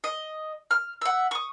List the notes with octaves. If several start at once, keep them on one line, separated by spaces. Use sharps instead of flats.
D#5
F6
E5 F#5
C#6 D#6